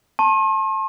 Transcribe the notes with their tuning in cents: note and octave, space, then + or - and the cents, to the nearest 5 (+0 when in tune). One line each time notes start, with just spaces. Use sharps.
A5 +0 C6 +45